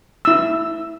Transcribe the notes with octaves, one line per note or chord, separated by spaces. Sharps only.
E4 E6